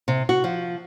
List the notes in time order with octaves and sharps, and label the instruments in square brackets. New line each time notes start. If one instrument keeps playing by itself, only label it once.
[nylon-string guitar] C3
F#4
F3